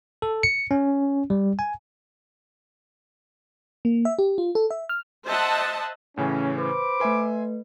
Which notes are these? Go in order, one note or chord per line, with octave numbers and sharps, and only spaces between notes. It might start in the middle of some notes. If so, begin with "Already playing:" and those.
A4
C#7
C#4
G3
G#5
A#3
E5
G4
F4
A4
E5
F6
C5 D#5 E5 F#5 A5
A2 C#3 E3 C#4
B4 C5 B5 D6
A3 B4 E5 G#5 C6